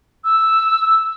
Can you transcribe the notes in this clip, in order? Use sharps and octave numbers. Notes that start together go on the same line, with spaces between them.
E6